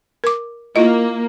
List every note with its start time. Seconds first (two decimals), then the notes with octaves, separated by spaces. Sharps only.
0.24 A#4 D6
0.76 A#3 E4 F4 D#5